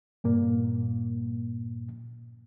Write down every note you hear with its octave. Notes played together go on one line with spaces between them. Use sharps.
G2 A#2 A#3